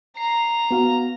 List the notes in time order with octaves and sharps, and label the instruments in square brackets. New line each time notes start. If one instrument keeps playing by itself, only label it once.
[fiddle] A#5 [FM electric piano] C7
[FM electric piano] B3 F#4 F5